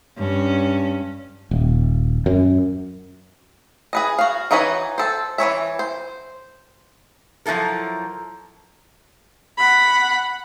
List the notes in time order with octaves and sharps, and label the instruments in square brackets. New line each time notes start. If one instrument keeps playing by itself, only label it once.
[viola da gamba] G2 C#4
[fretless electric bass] D#1
F#2
[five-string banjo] G#4 B4 D#5
F#4 F5
E3 D#4 F#4 B4 C#5
A4 C5
E3 F3 C#5 E5
C5
[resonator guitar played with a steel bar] F3 F#3 E4 A4 A#4
[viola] F#5 B5